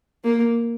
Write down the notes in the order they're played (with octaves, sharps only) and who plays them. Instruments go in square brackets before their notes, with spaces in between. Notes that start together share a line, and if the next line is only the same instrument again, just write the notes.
[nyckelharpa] A#3